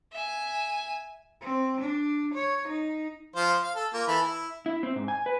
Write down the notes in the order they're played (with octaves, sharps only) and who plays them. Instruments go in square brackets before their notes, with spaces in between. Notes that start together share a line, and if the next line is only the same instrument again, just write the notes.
[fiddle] E5 G#5
[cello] C4
D4
C#5
D#4
[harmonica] F3 C5 F5
F5
A4
A#3 F4
E3 A4 B5
E4
[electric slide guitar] E4
C4
G#2
G#5
B4